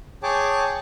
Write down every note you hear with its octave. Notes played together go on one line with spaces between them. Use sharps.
G#4 C#5 G5 A5 D6